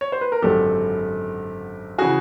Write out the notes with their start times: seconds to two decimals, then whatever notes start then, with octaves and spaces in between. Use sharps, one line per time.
0.01 C#5
0.12 C5
0.21 B4
0.32 A#4
0.42 G#1 F#2 D3 F#3 G4 A4
1.98 C#3 E3 F#4 G#4